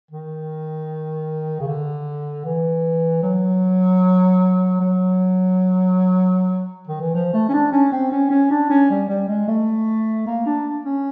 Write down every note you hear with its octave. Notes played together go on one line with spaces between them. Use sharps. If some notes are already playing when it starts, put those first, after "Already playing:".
D#3
C#3
D3
E3
F#3
F#3
D#3
E3
F3
A3
C#4
D4
C#4
C4
C#4
C#4
D4
C#4
G3
G3
G#3
A3
A#3
D4
C#4